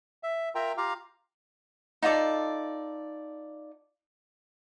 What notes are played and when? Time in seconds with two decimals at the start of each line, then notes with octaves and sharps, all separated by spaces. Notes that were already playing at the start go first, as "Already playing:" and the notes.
0.23 E5
0.55 F4 A#4 E5 G5 A#5
0.77 F4 G4 F5 A#5
2.02 D#4 F4 A4 D5